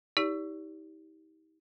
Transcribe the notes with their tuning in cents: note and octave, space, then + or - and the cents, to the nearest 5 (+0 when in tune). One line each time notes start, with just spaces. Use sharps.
D#4 +40 G4 +0 D5 -40